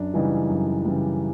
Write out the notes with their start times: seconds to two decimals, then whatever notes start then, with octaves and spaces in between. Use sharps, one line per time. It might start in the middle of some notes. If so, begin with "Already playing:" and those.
Already playing: F#2 D4
0.14 C#3 E3 G3 D#4
0.49 F#2
0.85 C#3 E3 G3